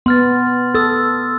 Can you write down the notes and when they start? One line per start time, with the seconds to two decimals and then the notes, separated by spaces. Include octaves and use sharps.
0.06 B3 C6 F6 A6
0.75 A4 D#6 E6 A6